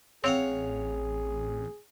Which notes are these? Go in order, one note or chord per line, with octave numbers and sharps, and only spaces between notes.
A1 C4 G#4 C#5 F5 F#5